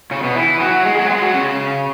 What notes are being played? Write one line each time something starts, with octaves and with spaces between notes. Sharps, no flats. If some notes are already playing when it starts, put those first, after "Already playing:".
C#3 C#4
B2 B3
E3 E4
F#3 F#4
G#3 G#4
F#3 F#4
G#3 G#4
F#3 F#4
C#3 C#4